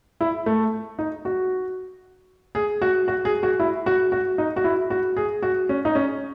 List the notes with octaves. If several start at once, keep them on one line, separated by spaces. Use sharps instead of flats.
E4
A3
D#4
F#4
G#4
F#4
F#4
G#4
F#4
E4
F#4
F#4
D#4
F#4
E4
F#4
G#4
F#4
C#4
D#4
C#4